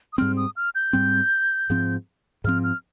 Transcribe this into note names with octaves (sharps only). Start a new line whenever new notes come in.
D#6
G#2 G3 C4 F6
D#6
F6
G6
G#2 G3 C4
G#2 F3 C4
G#2 F3 C4 F6
F6